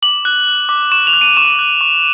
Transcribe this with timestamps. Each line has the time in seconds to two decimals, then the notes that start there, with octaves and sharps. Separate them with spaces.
0.02 D6 F#7
0.25 F#6
0.47 F#6
0.69 D6
0.92 C#6 E7
1.07 F7
1.13 F#6
1.21 D#7
1.37 C#6 E7
1.59 F#6
1.81 C#6